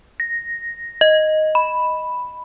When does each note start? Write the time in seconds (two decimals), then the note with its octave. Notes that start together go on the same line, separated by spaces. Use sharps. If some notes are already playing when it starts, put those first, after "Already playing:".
0.20 A#6
1.01 D#5
1.55 B5